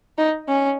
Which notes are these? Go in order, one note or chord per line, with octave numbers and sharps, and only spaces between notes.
D#4
C#4